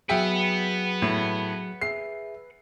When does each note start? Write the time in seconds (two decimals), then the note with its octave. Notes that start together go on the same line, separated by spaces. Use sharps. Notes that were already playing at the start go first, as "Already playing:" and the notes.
0.09 F#3 F#4 G#4 B4 E5 F#5 G5
1.02 A2
1.81 G#4 E5 C7